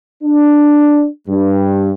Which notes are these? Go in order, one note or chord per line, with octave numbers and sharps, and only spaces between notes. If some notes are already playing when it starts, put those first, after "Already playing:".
D4
G2